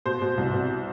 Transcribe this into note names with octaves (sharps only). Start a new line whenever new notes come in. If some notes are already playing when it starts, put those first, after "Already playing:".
B2 C5
B2
C2
B2